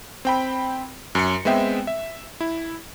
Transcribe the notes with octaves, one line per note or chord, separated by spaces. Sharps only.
C4 G5 B5
F#2 C6 C#7
G#3 B3 C4 E5 G5
E5
E4